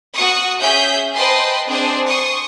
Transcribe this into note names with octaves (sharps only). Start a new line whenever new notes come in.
F#4 C#6 D#6
C#4 G#4 E5 G6 B6
B4 C5 D#5 G5 A5 C6
C4 D4 G#4 C5
C6 C#6 D#6